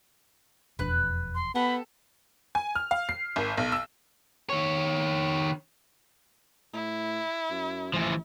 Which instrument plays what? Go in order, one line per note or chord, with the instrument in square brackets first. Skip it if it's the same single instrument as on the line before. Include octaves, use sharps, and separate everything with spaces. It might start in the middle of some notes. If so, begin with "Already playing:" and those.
[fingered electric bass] E1 F2 D4 [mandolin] B4 F#6
[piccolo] C6
[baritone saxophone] B3 [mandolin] G4 A4 [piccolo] B5
[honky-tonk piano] G#5
F6
F5
C7
G#1
B1
E6
[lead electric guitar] D#3 C#5
[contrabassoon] A2 [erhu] E4
[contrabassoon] F#2
[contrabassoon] A1 [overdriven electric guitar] E3 F3